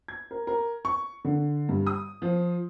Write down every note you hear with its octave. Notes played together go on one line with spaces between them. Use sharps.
G#6
A#4
A#4
C#6
D3
G2
D#6
F3